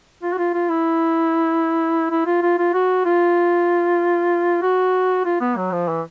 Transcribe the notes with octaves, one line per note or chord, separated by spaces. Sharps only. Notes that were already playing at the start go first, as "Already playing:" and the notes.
F4
F#4
F4
F4
E4
E4
F4
F4
F4
F#4
F4
F#4
F4
B3
F#3
F3
E3